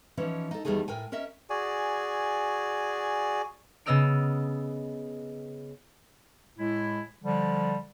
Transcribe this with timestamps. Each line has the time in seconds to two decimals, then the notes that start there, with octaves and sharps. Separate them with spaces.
0.17 E3 F3 C#4 D#4
0.51 D#4 A4
0.65 E2 D#3 G3 A3 G#4 G#5
0.88 A2 A#4 G5 G#5
1.12 C#4 A#4 D#5 E5
1.50 F#4 G#4 D5 G#5
3.86 C#3 B3 D#5 E6 F6 D7
6.58 A2 G#3 E4
7.23 D3 F3 G3